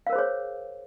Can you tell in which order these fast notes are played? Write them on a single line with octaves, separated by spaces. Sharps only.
F5 A#4 C5 G#4 C#5